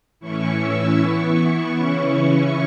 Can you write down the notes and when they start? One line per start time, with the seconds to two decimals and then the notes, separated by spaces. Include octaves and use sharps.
0.20 A2 E3 C#4 E4 C#6
0.60 E6
0.98 E3 B3 E4 C#6
1.37 C#6
1.76 C#3 E3 C#4 E4